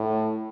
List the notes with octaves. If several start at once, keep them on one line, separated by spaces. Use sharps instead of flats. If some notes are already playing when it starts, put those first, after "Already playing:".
Already playing: A2